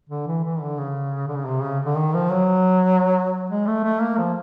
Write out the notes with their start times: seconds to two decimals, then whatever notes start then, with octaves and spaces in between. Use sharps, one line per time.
0.10 D3
0.27 E3
0.44 E3
0.61 D3
0.78 C#3
1.28 D3
1.36 C#3
1.46 C3
1.63 C#3
1.85 D3
1.97 D#3
2.14 F3
2.31 F#3
3.50 G#3
3.67 A3
3.84 A3
4.01 A#3
4.18 F3